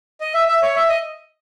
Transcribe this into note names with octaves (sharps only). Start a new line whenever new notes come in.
D#5
E5
E5
C#5
E5
D#5